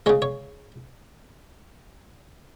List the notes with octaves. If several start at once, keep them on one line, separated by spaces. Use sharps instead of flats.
C#3 G#3 C#5
C#5